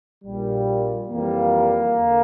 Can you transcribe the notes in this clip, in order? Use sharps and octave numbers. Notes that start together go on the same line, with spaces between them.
A#1 A#2 G3
F2 E3 G3 A#3
E2 D3